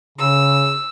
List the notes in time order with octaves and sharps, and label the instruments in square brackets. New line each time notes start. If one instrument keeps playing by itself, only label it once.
[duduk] C#3 [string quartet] E6